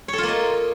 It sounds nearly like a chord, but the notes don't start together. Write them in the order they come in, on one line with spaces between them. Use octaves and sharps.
C#5 A4 F4 A#3 D#5